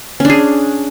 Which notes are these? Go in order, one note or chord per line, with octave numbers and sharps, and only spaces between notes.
C#4 D4 G#4